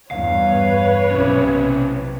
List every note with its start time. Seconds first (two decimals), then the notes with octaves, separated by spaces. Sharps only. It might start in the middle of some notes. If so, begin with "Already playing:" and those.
0.11 E2 G2 B4 C#5 F5
1.11 B1 C3 C#4 E4